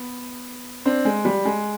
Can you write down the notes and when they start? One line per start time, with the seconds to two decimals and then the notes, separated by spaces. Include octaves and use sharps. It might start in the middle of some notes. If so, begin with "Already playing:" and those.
Already playing: B3
0.85 C4 D4
1.05 G#3
1.25 G3
1.45 G#3